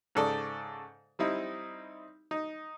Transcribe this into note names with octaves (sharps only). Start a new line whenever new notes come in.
G#2 C#3 A4 D5 D#6
G3 C4 D#4 E4
D#4